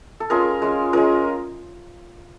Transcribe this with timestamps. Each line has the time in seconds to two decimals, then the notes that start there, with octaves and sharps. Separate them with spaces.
0.20 A4
0.30 G#3 C#4 F4 G#4 A#4
0.62 G#3 C#4 F4
0.93 G#3 C#4 F4 G#4 A#4